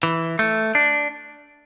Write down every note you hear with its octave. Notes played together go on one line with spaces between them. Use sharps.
E3
A3
D4